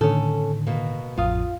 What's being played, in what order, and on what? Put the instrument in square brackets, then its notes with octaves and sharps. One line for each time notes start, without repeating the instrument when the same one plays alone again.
[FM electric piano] A2 D3 D#3 [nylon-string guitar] C#4 A4
[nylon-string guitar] B2 A#3
[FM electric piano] A1 F2 D#6 [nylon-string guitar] F4 F5